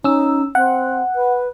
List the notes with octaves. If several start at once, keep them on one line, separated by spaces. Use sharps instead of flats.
C#4 D#4 E6
C4 F#5
B4